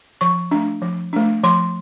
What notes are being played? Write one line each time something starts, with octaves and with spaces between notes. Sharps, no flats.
F3 C#6
A3 D4
F3
A3 D4
F3 C6